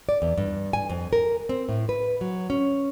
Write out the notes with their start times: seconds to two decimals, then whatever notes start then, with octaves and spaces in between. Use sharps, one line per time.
0.09 D5
0.22 E2
0.38 G2
0.73 G#5
0.89 F2
1.13 A#4
1.49 C4
1.69 A2
1.89 B4
2.21 F#3
2.50 C#4